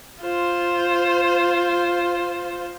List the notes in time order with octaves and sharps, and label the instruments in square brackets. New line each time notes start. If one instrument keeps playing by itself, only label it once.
[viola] F4 C5